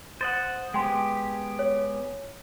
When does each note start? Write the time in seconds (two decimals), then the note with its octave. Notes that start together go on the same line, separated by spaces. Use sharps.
0.21 C5 D#5 F#5 A6
0.74 G#3 B3 G4 G5 C6
1.59 C#5